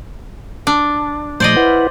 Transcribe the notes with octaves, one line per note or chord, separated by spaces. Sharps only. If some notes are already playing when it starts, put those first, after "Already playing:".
D4
A#2 F3 A3 C5 D5 D#5
E4 B4 F#5